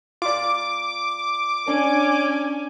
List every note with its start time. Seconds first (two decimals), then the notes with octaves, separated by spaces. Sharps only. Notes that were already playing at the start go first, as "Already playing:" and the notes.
0.22 F4 D5 D6
1.67 C#4 D4 G#5